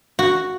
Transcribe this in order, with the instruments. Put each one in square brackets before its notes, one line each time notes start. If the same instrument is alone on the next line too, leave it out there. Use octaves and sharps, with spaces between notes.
[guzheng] F#4